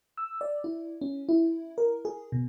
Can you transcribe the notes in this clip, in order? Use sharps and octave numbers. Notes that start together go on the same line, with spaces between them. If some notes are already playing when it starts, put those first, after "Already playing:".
E6
D5
E4
C#4
E4
A#4
G#4
B2